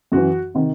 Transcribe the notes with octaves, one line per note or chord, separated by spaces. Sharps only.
F#2 E3 F#4
C3 D#3